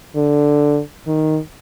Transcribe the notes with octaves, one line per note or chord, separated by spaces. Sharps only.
D3
D#3